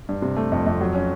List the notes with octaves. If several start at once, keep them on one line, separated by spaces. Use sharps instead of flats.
G2
C3
A3
F2
F2
F#3
C#4